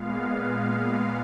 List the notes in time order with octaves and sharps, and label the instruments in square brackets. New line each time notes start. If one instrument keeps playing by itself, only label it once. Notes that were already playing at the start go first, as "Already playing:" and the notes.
Already playing: [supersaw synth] A#2 G#3 B3 F5